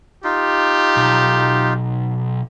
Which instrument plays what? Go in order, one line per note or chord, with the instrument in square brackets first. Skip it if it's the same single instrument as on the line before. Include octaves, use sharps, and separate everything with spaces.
[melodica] D#4 F4 [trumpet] G4
[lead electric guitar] B1